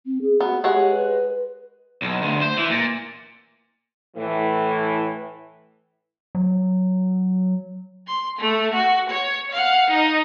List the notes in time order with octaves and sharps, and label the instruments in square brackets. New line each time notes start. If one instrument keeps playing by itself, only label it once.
[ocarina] C4
G#4
[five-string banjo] B3 [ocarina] F#4
[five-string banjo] G#3 C#5 F#5 [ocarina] G4
[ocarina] B4
[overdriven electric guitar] B1
D2
C5
E3
A#2
[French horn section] A2 E3
[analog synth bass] F#3
[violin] C6
A3
F#4
C#5
F5 F#5
D#4 D#5